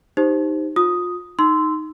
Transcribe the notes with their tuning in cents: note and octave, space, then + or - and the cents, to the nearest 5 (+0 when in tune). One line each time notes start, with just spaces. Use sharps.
D#4 +0 G4 +0 C5 +0
F4 +30 D#6 +0
D#4 +0 C6 -15 E6 +0